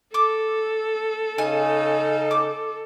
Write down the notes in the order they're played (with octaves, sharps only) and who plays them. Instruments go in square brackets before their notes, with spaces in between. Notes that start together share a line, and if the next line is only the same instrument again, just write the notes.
[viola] A4 [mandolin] D6
[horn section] C#3 D#4 [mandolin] G#5 A5
[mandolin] D6